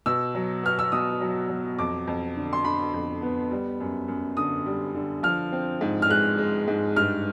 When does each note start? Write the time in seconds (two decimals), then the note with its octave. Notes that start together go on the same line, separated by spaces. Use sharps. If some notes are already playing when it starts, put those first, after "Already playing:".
0.06 B2 E6
0.35 F#3
0.63 B3 F6
0.79 E6
0.92 B2 D#6
1.21 F#3
1.49 F#3
1.79 F2 D6
2.07 F2
2.36 D3
2.53 C6
2.65 D3 B5
2.94 F2
3.22 B3
3.51 G3
3.80 F#2
4.08 F#2
4.37 D3 D#6
4.66 G3
4.95 D3
5.23 F3 F6
5.52 C4
5.81 G#2
6.02 F6
6.10 G#3 F#6
6.38 G#3
6.68 G#2
6.96 G2 F6